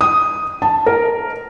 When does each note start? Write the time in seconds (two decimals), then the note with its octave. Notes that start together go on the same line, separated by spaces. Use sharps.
0.01 D#6
0.62 A5
0.86 A#4